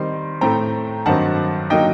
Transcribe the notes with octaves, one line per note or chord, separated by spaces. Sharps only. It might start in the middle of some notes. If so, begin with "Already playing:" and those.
Already playing: D#3 G3 C4 D#4 C6
A2 A3 C4 G5 A#5
G2 D#3 F#3 C4 F#5 A5
D3 F#3 A#3 D#4 D#5 G5